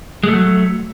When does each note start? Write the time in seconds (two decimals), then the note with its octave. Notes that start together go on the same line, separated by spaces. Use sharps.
0.23 G#3
0.28 A3
0.33 F#3